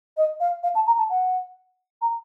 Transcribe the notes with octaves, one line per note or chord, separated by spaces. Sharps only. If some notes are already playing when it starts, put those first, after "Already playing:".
D#5
F5
F5
A5
A#5
A5
F#5
A#5